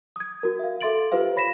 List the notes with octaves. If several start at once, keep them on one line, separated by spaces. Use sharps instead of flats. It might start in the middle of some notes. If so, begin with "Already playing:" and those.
D#6 G#6
F#4 A#4
E5 F5
A4 E5 C6 A6 D7 F#7
F4 G4 B4 C5 F5
C#5 B5 A#6 B6 E7